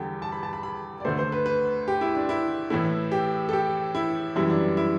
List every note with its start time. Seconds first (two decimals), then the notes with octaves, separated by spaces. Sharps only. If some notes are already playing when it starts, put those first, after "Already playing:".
Already playing: E2 D3 G3 G4 A4
0.22 A5
0.32 B5
0.43 A5
0.53 B5
0.63 B5
1.00 D5
1.05 D2 D3 A3 C5
1.19 C5
1.32 B4
1.46 B4
1.88 G4
2.01 E4
2.15 D4
2.29 E4
2.70 A2 E3 A3 E4
3.12 G4
3.49 A4
3.53 G4
3.95 E4
4.36 F#2 E3 G3 E4
4.50 D4
4.77 E4